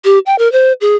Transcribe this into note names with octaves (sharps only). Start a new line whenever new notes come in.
G4
G5
A#4
C5
G#4